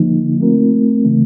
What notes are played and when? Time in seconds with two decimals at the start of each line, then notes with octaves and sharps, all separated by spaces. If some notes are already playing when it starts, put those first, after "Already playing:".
Already playing: D3 F3 A#3 D#4
0.40 A3 C4 F4 A#4
1.05 C#3 E3 A3